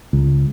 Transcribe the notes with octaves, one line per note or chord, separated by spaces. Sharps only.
C#2